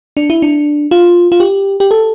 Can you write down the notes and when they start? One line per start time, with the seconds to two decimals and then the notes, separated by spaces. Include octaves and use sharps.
0.17 D4
0.30 E4
0.42 D4
0.91 F4
1.32 F4
1.40 G4
1.80 G4
1.91 A4